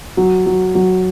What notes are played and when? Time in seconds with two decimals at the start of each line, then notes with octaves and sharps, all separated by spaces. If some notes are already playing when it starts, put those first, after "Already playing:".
0.17 F#3
0.46 F#3
0.75 F#3